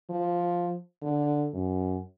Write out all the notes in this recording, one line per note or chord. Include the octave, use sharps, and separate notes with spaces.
F3
D3
F#2